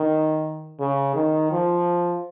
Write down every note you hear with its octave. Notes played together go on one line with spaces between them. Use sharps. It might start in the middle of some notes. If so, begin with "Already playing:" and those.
Already playing: D#3
C#3
D#3
F3